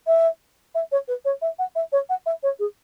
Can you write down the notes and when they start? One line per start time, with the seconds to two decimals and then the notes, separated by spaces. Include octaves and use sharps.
0.07 E5
0.75 E5
0.92 C#5
1.08 B4
1.25 C#5
1.41 E5
1.58 F#5
1.75 E5
1.92 C#5
2.09 F#5
2.26 E5
2.43 C#5
2.59 G#4